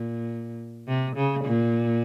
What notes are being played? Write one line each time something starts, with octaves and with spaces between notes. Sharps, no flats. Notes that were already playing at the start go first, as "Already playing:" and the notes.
Already playing: A#2
C3
C#3
A#2